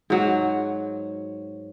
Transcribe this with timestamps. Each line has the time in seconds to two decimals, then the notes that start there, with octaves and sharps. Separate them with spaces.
0.10 G#2 F#3